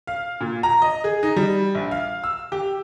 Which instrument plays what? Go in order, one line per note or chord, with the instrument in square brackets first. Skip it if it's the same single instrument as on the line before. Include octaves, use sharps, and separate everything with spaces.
[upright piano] F5
A#2
A#5
D#5
G#4
D#4
G3
A#1
F5
E6
G4